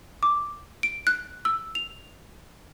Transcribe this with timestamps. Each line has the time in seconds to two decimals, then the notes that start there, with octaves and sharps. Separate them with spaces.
0.23 D6
0.83 D7
1.07 F#6
1.45 E6
1.75 F7